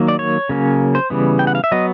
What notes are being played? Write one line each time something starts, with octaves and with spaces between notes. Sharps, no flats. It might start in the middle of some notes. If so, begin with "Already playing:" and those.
Already playing: D#3 F#3 A#3
D5
C#5
C#3 F#3 A#3 C#4
C5
C#3 E3 G3 B3
G5
F#5
F5
E5
F#3 B3 D#5